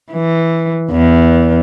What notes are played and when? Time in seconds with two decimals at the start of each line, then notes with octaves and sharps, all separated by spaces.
0.12 E3
0.91 E2